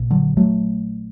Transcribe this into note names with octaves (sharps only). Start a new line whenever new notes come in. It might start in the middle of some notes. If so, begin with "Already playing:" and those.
Already playing: A#1 A#2
D3 F#3
F#3 A3